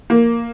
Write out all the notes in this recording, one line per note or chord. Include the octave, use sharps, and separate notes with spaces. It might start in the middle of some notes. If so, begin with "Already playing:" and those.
A#3